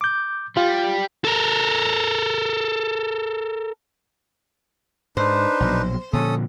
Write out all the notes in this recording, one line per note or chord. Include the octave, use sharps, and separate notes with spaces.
D6 G6
G3 F4
A4 A#4
G#2 D4 D#4 B4 C5
A#1 B2 F#3
A#2 D3 F3 C#4 A4 D#6